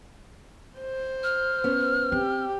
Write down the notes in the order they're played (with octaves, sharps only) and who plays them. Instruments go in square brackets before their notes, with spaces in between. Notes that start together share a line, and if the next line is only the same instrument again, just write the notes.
[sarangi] C5
[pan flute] F6
[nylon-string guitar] B3 C#4
[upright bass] C4 [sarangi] G4